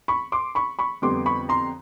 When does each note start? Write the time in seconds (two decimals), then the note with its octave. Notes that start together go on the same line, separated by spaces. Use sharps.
0.08 B5 C#6
0.32 C6 D6
0.55 B5 C#6
0.79 B5 C#6
1.02 F2 D3 G3 B3 C6 D6
1.26 B5 C#6
1.49 A#5 C6